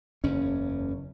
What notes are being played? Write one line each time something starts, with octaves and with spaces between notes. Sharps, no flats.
F#1 E2 C#4